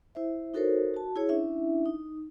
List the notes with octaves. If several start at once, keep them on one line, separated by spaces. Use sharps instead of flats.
E4 C5 E5
D#4 F#4 A4 A#4 C5 C#5
F#4 A5
E4 G#4 C#5
C#4 D4 E4 E5
D#4